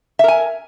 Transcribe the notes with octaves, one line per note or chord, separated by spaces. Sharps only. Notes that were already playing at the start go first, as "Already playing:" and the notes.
A#4 E5 G#5